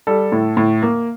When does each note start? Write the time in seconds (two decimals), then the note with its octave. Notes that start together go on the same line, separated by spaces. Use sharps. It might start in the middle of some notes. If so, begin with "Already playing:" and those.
0.07 G3 A4
0.32 A2
0.57 A2
0.82 A#3